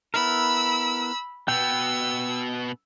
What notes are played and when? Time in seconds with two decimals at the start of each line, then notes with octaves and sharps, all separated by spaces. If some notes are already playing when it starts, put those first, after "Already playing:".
0.14 B3 E4 A#4 B5 E6
1.48 B2 B3 G5 E6 G6